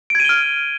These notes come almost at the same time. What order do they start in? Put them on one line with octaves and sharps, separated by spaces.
D7 G#6 D#7 G7 F6